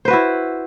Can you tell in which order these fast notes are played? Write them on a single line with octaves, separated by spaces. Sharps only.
C5 B4 F#4 E4